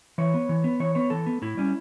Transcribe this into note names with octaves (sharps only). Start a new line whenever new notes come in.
E3 C#5
B3
E3
B3
E3 C#5
B3 C#5
E3 A4
B3
A2 E4
G3 C#4